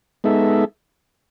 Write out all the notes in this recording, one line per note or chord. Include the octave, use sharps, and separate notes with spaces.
G#3 B3 D#4 A4 E5